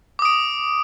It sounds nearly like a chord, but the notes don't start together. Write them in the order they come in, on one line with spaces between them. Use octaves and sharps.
D6 D#6 D7